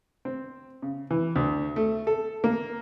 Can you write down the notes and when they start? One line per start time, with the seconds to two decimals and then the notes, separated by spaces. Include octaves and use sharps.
0.25 C4
0.82 C#3
1.11 E3
1.36 D2
1.76 A3
2.07 A4
2.44 A#3